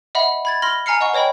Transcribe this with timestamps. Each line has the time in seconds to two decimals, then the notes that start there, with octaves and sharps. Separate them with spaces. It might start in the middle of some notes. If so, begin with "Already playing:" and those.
0.15 D#5 E5 F#5 B5
0.45 B5 G#6 A6
0.62 B5 C6 F6 A#6 F#7
0.86 G#5 A#5 F6 C7 C#7
1.01 D#5 F#5 C#6
1.14 B4 C#5 D#5 G5 B5